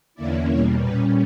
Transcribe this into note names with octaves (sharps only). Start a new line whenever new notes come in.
E2 D3 A#3 C#4 E4 D5
E2 B2 G3 A#3 C#5
A#2 G3 C#4 B4